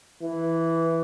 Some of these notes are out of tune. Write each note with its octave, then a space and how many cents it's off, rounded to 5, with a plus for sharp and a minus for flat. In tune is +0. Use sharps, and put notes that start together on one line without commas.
E3 +0